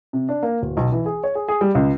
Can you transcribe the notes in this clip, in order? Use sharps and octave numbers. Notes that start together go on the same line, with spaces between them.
C3
D4
A#3
D1
B1
E3
G#4
C#5
G#4
G#4
G3
C#2